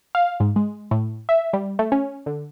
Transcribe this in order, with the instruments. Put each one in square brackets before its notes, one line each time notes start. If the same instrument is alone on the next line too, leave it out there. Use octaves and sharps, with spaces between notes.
[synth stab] F5
G#2
G#3
A2
E5
G3
A3
C#4
D3